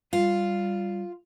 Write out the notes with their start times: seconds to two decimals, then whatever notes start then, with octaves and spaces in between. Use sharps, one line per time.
0.13 G3 F4